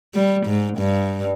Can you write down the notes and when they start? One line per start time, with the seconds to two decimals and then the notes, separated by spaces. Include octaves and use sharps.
0.15 G3
0.47 G#2
0.79 G2